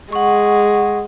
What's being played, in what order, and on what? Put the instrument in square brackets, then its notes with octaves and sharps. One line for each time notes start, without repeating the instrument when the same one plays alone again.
[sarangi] G#3 [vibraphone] F#5 C#6